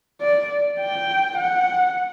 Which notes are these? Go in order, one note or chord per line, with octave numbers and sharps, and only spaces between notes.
D5
G5
F#5